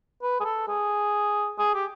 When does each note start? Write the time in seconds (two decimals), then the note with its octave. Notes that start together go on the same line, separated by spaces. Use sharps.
0.22 B4
0.40 G#4
0.45 A4
0.68 G#4
1.58 G#4
1.74 G4